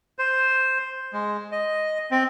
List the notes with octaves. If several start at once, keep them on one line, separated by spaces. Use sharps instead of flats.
C5
G#3
D#5
C4